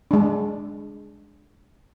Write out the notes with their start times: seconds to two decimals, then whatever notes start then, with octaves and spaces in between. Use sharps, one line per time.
0.11 G#3 D4